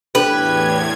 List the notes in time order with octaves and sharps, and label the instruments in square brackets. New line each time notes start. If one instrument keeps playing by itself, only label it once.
[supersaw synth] E2 A2 G#6 [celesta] D4 A4 [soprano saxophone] G4 [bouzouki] B4